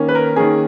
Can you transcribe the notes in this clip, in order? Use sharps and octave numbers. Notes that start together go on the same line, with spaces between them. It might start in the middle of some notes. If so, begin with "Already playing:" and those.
Already playing: D#3 A#3 C#4
B4
A#4
D#3 A#3 C#4 G#4